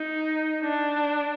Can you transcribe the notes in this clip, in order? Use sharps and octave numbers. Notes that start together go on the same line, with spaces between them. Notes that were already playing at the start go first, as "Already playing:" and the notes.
Already playing: D#4
D4